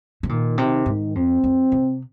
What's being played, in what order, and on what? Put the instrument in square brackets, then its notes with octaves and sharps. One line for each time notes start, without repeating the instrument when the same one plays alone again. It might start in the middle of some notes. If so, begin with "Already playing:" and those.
[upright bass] C3
[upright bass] A#2 [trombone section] D#3
[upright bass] C3 [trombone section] D#3
[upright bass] G#2 [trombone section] D#3
[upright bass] F2 [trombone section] C4
[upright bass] F2
C3